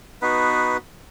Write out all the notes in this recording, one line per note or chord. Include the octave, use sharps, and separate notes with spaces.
B3 D#4 F#4 B4